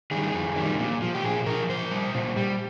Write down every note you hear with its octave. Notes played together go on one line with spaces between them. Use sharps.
D#3 G3 G#4
F2
D#3 G3
A#2
F3
G4
A#2 G#4
F3 A#4
A#2 C5
G3
A#2
G3